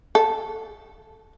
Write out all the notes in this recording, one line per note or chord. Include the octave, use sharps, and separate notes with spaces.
A4